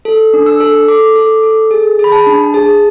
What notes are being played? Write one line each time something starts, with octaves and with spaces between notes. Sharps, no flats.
A4
D4
E6
A4
A4 D6
A4
A4
G#4
G#4
B5
A5
D4
G#4